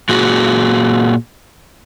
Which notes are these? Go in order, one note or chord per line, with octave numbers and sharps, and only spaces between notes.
A#2 F#4 G#4